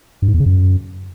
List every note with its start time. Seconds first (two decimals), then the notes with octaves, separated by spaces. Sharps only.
0.22 G2
0.28 G#2
0.34 E2
0.40 C#3
0.46 F#2